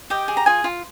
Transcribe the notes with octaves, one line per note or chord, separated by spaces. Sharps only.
G4 D#5 G5
G#4
A#5
F4 G#4 G#5
F4